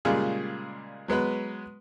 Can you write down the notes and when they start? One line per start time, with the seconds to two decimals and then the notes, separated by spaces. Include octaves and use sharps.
0.05 A#2 C#3 G3 G#3 F4 G#4
1.08 F#3 G#3 B3 B4